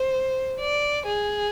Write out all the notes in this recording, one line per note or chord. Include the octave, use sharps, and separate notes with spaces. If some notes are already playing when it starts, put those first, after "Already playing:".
Already playing: C5
D5
G#4